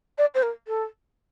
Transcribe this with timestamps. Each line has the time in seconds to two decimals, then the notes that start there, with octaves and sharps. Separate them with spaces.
0.18 D5
0.35 C5
0.43 A#4
0.68 A4